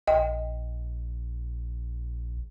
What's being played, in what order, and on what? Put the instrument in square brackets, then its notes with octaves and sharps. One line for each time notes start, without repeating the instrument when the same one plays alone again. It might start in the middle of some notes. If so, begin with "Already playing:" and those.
[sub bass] A#1 [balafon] D#5 G5